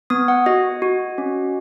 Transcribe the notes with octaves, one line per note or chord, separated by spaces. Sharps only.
B3 D#6
F#5
F#4 D#5
F#4
C#4